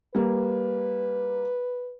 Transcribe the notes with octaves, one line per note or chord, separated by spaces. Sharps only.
G3 A#3 B4